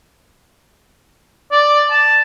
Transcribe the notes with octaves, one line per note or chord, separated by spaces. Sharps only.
D5
A5